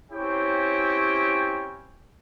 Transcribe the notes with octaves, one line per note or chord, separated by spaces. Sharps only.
C4 C#4 E4 G4 C#5 G5